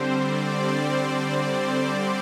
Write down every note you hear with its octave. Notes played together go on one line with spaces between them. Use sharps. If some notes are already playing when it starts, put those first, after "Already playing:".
Already playing: D3 G3 C4 C5
D5
D5